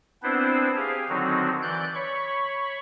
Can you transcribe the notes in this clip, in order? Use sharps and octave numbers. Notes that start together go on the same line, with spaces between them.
B3 C4 D4 E4 B4 C5
G4 G#4 F5
D3 D#3 F#3 C4 D#4 F#4
E3 D5 F#6 G6
C#5 B5 C#6